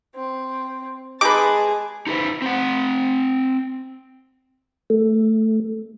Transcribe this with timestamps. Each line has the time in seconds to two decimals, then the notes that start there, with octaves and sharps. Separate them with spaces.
0.15 C4
1.21 G#3 D#4 G#4 B4 A5 D6
2.07 D#4 F4 G#4 B4 C5
2.42 C4 F#5
4.90 A3